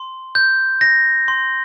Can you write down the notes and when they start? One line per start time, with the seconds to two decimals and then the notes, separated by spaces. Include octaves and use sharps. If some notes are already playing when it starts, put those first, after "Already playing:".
Already playing: C6
0.35 G6
0.81 G6 A#6
1.28 C6